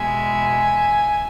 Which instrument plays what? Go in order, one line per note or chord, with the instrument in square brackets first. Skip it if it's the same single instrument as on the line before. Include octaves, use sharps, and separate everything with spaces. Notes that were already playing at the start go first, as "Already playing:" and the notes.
Already playing: [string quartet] E2 B2 G#3 E5 G#5